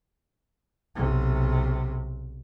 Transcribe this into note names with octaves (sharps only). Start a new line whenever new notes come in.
B1 C3